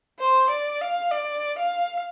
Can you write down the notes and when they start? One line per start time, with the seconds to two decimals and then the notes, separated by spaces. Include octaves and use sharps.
0.19 C5
0.50 D5
0.81 F5
1.11 D5
1.58 F5